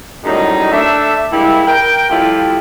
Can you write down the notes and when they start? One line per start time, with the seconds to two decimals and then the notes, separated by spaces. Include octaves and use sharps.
0.24 F#2 A2 G3 G#3 D#4
0.72 A3 D4 E5
1.33 G3 G#3 A#3 E4
1.67 A#4 G5
2.10 F3 G3 A3 E4 F4 G4